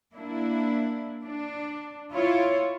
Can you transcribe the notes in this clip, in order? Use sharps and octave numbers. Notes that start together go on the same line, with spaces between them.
A#3 D4 E4
D4
E4 F4 C#5